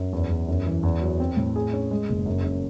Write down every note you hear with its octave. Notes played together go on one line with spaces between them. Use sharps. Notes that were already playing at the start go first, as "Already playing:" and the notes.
Already playing: F#2
E2
E2
F#2
E3
E2
F#3
C4
A2
G#4
C#4
G#3
F#1
F#2
F#2